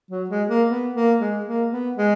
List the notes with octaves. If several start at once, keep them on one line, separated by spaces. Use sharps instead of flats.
F#3
G#3
A#3
B3
A#3
G#3
A#3
B3
G#3